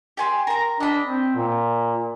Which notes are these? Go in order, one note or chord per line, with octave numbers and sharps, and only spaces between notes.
G4 G#5 C6
A#4 A#5
D4 D#5 B5
C4
A#2